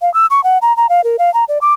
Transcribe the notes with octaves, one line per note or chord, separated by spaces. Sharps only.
F5
E6
C#6
F#5
A#5
A#5
F5
A#4
F5
A#5
D5
D6